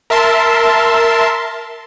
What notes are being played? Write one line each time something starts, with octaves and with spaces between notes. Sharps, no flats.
A#4 E5 A5 C6